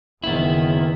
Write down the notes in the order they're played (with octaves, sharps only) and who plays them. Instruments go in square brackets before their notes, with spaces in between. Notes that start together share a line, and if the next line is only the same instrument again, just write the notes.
[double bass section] F#1 D#3 [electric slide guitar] B3 E4